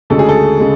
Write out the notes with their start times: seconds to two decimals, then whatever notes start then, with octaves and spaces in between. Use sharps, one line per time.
0.10 D2 C#3 G#3 A4
0.19 G#4
0.29 A4
0.59 C#3 G#3